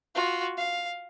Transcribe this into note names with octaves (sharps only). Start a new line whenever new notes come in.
F4 F#4
F5